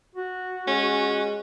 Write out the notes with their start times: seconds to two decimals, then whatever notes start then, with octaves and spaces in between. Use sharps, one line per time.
0.15 F#4
0.68 G#3 C#4